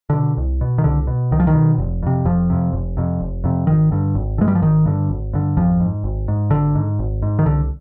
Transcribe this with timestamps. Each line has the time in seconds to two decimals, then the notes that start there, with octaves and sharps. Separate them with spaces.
0.10 B2 D3
0.37 C2
0.61 B2
0.78 D#3
0.84 C2 D3
1.07 B2
1.31 C2 D#3
1.40 F3
1.47 D#3
1.55 B2
1.78 F1
2.03 F2 C3
2.25 F1 F2 F3
2.50 F2 C3
2.73 F1
2.97 F2 C3
3.20 F1
3.44 F2 C3
3.67 G#1 D#3
3.92 G2 D3
4.15 G#1
4.38 D3
4.41 G2 G#3
4.48 G3
4.55 F3
4.62 G#1 D#3
4.85 G2 D3
5.09 G#1
5.33 G2 D3
5.57 G#1 F2 F3
5.80 G#2
6.04 G#1
6.28 G#2
6.51 G#1 D3
6.75 G#2
6.99 G#1
7.22 G#2
7.39 D#3
7.45 C2 D3